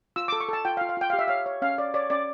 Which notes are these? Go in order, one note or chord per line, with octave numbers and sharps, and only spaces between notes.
F4 E6
D6
A4
C#6
A4 A5
F4 G5
F5
F4
F5
F4 G5
G4 F5
E5
C#5 F5
C#5
C#4 F5
C#5 D5
C#5 D5
C#4 D5